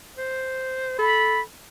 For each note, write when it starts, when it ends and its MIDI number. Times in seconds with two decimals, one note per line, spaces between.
0.17 0.95 72
0.98 1.41 69
0.98 1.41 83